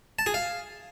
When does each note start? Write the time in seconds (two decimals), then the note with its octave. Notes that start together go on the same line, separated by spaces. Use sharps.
0.19 A5
0.26 G#4
0.34 F5